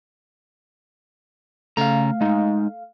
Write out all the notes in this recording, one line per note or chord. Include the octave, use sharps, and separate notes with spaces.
C#3 A3 F5 A#5
G#3 D#4